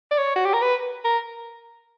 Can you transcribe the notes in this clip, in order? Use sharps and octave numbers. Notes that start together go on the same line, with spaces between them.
D5
C#5
F#4
G4
A#4
B4
A#4